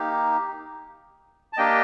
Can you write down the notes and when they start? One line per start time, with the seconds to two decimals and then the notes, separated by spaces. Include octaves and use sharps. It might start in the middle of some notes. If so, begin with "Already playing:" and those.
Already playing: A#3 D#4 G4
1.53 A5
1.57 A#3 D4 G4 D#5 G5